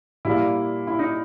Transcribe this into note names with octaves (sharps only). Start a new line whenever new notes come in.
A#2 G3 A#3 E4
E4
D#4